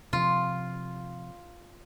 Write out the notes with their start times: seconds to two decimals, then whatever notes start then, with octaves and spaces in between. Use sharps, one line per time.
0.13 C3 F3 F4